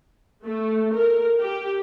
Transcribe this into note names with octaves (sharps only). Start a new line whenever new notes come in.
A3
A#4
G4